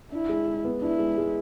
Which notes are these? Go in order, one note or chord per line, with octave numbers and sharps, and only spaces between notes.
D4 E4
G#3
G#3
B3
D4 E4
G#3
G#3